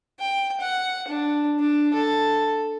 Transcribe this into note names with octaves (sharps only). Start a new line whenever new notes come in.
G5
F#5
D4
D4
A4